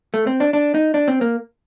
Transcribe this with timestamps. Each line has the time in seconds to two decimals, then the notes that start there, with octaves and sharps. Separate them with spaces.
0.14 A3
0.27 C4
0.40 D4
0.53 D4
0.74 D#4
0.94 D4
1.08 C4
1.21 A#3